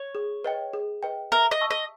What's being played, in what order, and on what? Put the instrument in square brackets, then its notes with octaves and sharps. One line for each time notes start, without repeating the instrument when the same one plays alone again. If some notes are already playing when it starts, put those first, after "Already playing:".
Already playing: [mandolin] C#5
[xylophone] G#4
B4 D#5 G5
G#4
B4 D#5 G5
[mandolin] A#4 [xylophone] E5
[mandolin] D#5
[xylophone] A5 C#6 E6
[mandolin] D#5